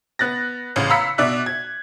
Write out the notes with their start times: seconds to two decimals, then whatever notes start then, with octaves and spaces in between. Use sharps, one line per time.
0.19 B3 F#6 A6 A#6
0.76 A1 C#3
0.89 F5 A#5 B5 E6 B6 C#7
1.18 B2 D5 E5 F#6
1.46 G#6